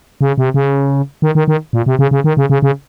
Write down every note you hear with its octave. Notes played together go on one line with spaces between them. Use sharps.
C#3
C3
C#3
D#3
D#3
D#3
A#2
C3
C#3
C#3
D#3
C#3
C#3
C#3